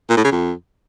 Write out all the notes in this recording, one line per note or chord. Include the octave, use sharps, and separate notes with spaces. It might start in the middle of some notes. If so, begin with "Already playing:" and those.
A#2
A2
C#3
F2